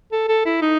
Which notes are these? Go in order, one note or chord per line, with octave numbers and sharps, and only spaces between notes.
A4
A4
E4
D#4